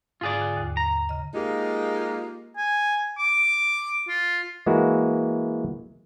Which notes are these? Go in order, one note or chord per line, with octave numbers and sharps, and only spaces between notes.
G#2 D3 F4 G#4 D5
D3
D#2
A#5
C#3 D#5
G#3 A#3 D#4 F4 G4
G#5
D6
F4
E3 G#3 A#3 E4 F#4